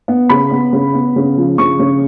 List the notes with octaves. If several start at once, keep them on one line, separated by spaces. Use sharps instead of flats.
B3
C#3 B5
B3
C#3
B3
C#3
F3
C#3 C#6
C#3